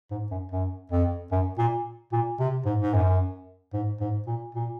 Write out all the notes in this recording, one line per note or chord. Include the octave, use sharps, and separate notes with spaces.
G#2
F#2
F#2
F2
F#2
A#2
A#2
C3
G#2
G#2
F#2
G#2
G#2
A#2
A#2